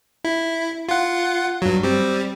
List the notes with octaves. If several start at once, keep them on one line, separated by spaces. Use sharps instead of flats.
E4
F4 F#5
G2 F#3
G3 C4